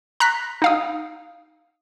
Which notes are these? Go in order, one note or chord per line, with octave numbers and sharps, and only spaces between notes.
A#5 F#6 A#6 B6
D#4 F5 D#6